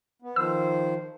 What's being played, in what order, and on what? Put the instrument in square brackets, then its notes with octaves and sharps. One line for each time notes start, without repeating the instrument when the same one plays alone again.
[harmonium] B3
[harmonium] D#3 F3 C5 [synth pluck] E6